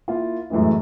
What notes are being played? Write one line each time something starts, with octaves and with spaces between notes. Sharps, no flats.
A#3 E4 F4
F#2 A2 E3 G#3 E4